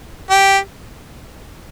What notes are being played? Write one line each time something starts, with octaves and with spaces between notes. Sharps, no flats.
G4